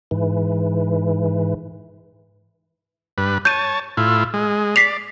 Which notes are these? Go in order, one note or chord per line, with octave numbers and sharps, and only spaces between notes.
G#2 E3
G2 B4
C#5 A5 G6 D#7
A2 E4 F4
G#3
D5 B6 C7 F7